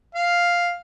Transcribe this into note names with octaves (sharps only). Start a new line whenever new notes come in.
F5